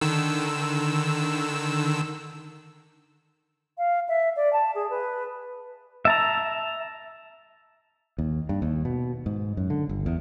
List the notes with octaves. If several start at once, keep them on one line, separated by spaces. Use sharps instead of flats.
D3 D#3 E6
F5
E5
D5
A5
G#4
B4
E5 A5 A#5
D#2
G2
D#2
B2
G#2
F#2
D3
G1
E2